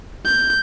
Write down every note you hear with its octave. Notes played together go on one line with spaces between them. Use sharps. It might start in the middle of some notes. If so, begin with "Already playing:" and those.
G6